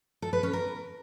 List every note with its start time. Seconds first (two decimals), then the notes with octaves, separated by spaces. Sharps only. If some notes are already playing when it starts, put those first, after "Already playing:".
0.22 A4
0.33 B4
0.43 C#4
0.53 A#4